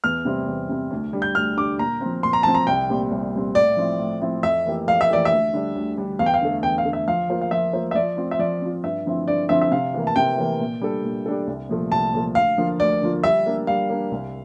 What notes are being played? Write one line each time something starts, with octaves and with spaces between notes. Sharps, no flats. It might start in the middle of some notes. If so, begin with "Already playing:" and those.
E2 F6
C3 G3 C4
E2
C3 G3 C4
D2
D3 G3
G6
D2 F6
D3 G3 D6
A#2 A#5
F3 C4
A#2 C6
A#5
F3 C4 A5
A#5
C2 G5
A#2 G3 C4
C2
A#2 G3 C4
A2 D5
F3 C4 E4
A2
F3 C4 E4
F2 E5
E3 A#3 E4 G4
F2 F5
E5
E3 A#3 E4 G4 D5
E5
D2
D3 G3 D4
D2
D3 G3 D4
E2 F5
G5
F5
D3 A3
E2 G5
F5
D3 A3
E5
F3 F5
A#3 F4 C5
F5
F3 E5
A#3 F4 C5
E5
F3 D5
C4 F4
E5
F3 D5
C4 F4
G2 E5
D3 F3 C4 E4
G2 D5
D3 F3 C4 E4 E5
E5
C3 F5
E3 A#3
A5
C3 G5
E3 A#3
A#2
G3 D4 A4
A#2
G3 D4 A4
C2
A#2 F3 A3
C2 A5
A#2 F3 A3
D2 F5
D3 F3 A#3 F4
D2 D5
D3 F3 A#3 F4
G3 E5
A#3 D4
G3 F5
A#3 D4
C2